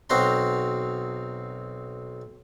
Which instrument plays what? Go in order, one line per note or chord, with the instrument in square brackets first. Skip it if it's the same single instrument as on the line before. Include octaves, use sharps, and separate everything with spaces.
[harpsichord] B1 C4 F#4 F5 A#5 C6